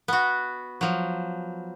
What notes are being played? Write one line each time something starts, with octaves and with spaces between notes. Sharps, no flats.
B3 F#4
F3 F#3